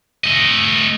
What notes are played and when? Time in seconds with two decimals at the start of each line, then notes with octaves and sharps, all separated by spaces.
0.24 A3 D#5